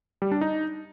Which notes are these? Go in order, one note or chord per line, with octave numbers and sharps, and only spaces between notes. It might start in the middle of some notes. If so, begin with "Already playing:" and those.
G3
D4
D#4